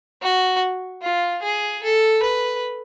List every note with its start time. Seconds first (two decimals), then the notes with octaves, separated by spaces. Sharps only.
0.22 F#4
1.02 F4
1.43 G#4
1.83 A4
2.23 B4